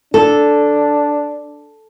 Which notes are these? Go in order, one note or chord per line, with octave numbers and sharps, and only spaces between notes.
D4 A4